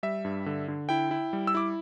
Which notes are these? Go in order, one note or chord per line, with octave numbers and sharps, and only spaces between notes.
G3 E5
G2
D3
D3
E4 G5
E4
G3
E6
E4 D6